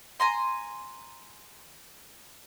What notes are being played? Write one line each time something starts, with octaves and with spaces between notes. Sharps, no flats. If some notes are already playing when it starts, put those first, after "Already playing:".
G#5 A#5 C6